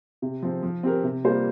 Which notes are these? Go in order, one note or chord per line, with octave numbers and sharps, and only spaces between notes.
C3
F3 C4
F3
C4 G4 A#4
C3
G3 A#3 F4 C5